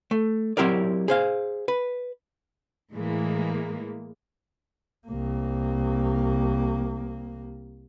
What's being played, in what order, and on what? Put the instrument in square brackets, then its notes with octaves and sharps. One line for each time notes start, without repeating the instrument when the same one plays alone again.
[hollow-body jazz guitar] A3
F#3 C4 E4 G4 A#4 D5
G#4 C5 F5
B4
[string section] A2 E3 G#3 A#3
[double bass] C2 A#3